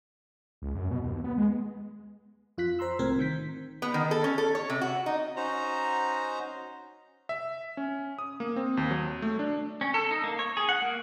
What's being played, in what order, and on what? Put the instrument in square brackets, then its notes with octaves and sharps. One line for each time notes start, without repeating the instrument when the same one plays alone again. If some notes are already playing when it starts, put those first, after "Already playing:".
[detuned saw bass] C#2
F#2
B2
D#2
B3
G#3
[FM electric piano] F2 F4 F#6 B6
C5 A#5 C6 E6
C2 A2 C4 A#4 G#6
D#3 G6 B6
[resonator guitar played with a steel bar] B3
D#3
A4
C#4
A4
C#5
C3
F#4
D#4
[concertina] C#4 D#4 F#4 C5 A#5
[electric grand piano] E5
C#4
D#6
A#3
C4
D#2
F#3
A3
D4
[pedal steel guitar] C#4
A4
D#4
A#3
C#5
G#4
F#5
A#3